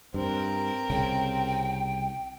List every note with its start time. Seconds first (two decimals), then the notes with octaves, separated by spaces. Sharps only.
0.14 G2 C4 A#4
0.90 C2 C#3 G5